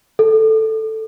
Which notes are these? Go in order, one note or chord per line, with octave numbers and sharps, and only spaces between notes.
A4